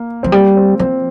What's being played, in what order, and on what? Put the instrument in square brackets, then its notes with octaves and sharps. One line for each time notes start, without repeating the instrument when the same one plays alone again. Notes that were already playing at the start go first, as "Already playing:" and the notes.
Already playing: [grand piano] A#3
[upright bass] F3 [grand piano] C4
[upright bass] G3 [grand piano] A#3
[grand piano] C4
[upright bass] F3 [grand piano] C4